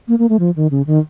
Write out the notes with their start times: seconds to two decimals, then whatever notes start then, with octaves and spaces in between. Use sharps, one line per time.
0.08 A#3
0.19 A#3
0.29 A3
0.40 F3
0.56 D#3
0.71 C#3
0.87 D#3